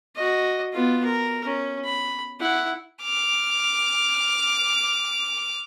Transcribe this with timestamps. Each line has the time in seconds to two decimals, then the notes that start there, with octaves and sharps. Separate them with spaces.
0.15 F#4 D#5
0.73 B3 F4
1.05 A#4
1.45 C#4
1.85 B5
2.40 E4 F#5
3.02 D6 F6